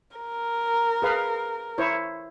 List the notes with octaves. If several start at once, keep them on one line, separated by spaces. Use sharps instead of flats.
A#4
G#4 B4 F5
E4 C5 C#5